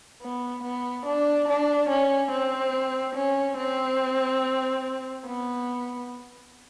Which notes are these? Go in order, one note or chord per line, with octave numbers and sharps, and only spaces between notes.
B3
B3
D4
D4
C#4
C4
C#4
C4
B3